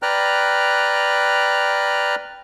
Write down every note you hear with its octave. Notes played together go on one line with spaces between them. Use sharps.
B4 D5 G5 A#5 F6 F#6